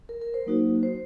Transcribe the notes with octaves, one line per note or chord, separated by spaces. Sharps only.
A#4
A#4
C5
F#3 A#3 D#4 F#4
C5